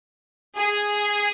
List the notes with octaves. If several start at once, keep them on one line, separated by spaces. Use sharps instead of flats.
G#4